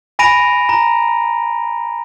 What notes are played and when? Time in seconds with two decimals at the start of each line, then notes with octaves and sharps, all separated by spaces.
0.19 G#5 B5 A#6 D7 D#7 F7
0.69 A#5